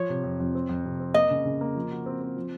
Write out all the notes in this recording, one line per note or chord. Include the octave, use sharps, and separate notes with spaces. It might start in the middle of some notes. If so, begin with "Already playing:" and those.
Already playing: F3 C#5
C3
F2
F2
C4
F2
C3
C4
A#3 D#5
C#3
C#3
A#3
F3
F#4
C4
C4
F3